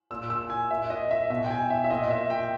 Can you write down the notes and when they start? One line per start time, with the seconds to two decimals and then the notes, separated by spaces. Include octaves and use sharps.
0.11 A#2 E6
0.30 E6
0.50 G#5
0.70 A#2 E5
0.90 D#5
1.11 E5
1.30 B2 E5
1.45 G5
1.51 G#5
1.70 E5
1.84 E5
1.90 A#2 D#5
2.11 E5
2.30 G5